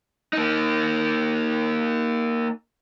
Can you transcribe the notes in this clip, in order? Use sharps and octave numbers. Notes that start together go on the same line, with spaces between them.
A#3 D#4